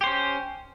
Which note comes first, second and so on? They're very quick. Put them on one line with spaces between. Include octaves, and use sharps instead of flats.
G4 C5 C#4